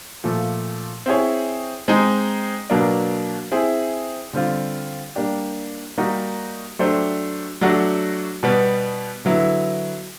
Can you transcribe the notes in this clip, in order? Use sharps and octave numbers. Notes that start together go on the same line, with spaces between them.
A#2 F3 A3
C4 E4 G#4 C#5
G#3 C4 D#4
B2 F#3 A#3 D4
C4 E4 G#4
D3 G3 C4 F4
G3 A#3 D4 G4
G3 A#3 D#4 F#4
F#3 A3 D4 G4 C5
F#3 A3 D4 F#4
B2 G3 B3
D3 F#3 B3 E4